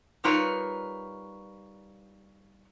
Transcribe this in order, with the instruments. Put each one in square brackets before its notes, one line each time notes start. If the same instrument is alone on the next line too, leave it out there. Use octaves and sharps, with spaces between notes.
[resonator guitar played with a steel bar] G3 D#4 F4 A#4 B4 C#5